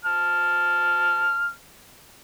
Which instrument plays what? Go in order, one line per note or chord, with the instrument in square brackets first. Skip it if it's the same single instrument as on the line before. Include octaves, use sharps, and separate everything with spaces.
[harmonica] A5 F6